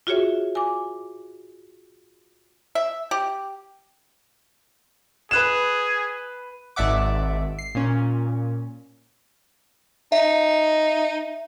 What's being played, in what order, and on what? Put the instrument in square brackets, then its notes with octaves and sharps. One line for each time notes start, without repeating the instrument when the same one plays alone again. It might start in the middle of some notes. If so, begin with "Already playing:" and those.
[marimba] F4 F#4 G#4 C#5 E5
G#5 D6
[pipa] E5
G4
[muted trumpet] G#4 [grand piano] B4 F#6 E7
[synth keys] G#1 D5 E5 F#5 D6
C7
A#2 C#4
[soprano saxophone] D#4 [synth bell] E5